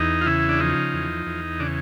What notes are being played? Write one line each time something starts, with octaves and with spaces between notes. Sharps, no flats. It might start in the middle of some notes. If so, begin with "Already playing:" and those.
Already playing: E2 D#4
F4
C#3 E4
D4
F3 D#4
E2
E2
C#3 D4